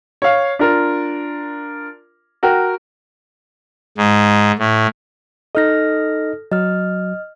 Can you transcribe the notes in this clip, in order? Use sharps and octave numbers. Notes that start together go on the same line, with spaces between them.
C#5 F5
D4 F4 A#4
F#4 A#4 G5
G#2
A2
D#4 A4 D#5 F6 A#6
F#3 D#5 F6